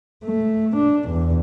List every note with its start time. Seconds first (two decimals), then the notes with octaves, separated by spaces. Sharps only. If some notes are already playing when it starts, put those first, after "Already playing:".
0.25 A3
0.76 D4
1.10 E2